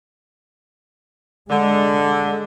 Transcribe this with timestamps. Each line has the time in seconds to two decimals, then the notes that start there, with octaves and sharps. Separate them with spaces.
1.50 D3 G#3